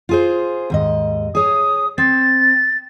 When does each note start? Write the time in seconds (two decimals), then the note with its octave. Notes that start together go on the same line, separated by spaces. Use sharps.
0.09 F4 G#4 C5
0.70 D#2 G#2 D#5
1.35 G#4 C#5 D#6
1.98 C4 A6